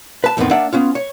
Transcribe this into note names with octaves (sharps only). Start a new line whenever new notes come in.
B4 A5
E2 A2 D#3 A3 B3 C4
A#3 D4 D5 E5 F#5
B3 C#4 F4
C#5